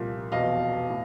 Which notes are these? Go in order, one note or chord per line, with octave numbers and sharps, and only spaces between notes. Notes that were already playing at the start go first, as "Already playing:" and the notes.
Already playing: C2 A#2 F3
F1 E2 B2 D#5 F5
A2